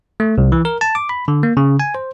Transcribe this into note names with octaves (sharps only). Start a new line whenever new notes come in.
A3
C2
E3
A#4
A5
D6
B5
D3
A#3
C#3
G#5
C5